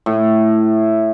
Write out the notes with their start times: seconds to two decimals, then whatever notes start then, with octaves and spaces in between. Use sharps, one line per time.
0.06 A2